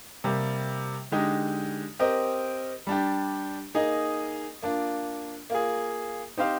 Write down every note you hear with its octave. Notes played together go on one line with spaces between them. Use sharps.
C3 G3 A#3
D3 G#3 D#4 G4
C4 G4 A#4 D#5
G3 D4 G4
A#3 D#4 G#4 D#5
A#3 D4 F4
A#3 F4 G#4
C4 D#4 G4 C5 F5